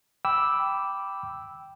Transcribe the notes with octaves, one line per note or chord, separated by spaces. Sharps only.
G5 B5 D6 E6